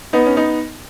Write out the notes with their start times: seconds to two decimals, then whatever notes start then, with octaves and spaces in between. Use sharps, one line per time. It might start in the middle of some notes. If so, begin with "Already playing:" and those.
0.13 B3 D#4
0.26 C#4
0.36 B3 D#4